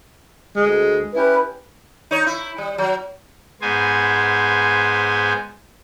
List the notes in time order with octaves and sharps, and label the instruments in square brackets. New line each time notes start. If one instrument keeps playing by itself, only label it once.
[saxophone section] D2 G#3
[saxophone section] C#4 E4 G4 [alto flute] B4
[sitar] D#4 C#5
E4
G3
F#3
[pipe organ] G#2 B3 C5 G#5